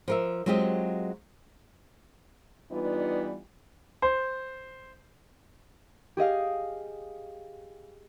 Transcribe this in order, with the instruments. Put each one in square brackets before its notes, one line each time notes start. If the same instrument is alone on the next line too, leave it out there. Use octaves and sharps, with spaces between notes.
[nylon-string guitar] F3 A#4 E5
F#3 G#3 C4 F4 G4 D#5
[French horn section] E3 G3 B3 D4 D#4 F4
[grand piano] C5
[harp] G4 G#4 D#5 F5